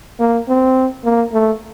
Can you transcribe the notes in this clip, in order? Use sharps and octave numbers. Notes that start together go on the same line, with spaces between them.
A#3
C4
A#3
A3